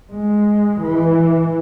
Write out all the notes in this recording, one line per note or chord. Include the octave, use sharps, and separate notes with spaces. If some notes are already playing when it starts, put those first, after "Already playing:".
G#3
E3